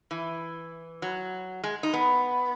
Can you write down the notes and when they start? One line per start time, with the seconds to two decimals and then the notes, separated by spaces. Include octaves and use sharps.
0.11 E3
1.02 F#3
1.64 G#3
1.83 D#4
1.93 B3